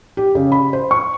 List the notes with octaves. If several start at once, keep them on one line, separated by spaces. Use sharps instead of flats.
G4
C#3
B5
C5
C#6